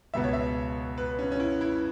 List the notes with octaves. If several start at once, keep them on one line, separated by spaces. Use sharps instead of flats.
C#2 B2 B3 E5
C#5
E5
B4
C#4
C#4
E4
E4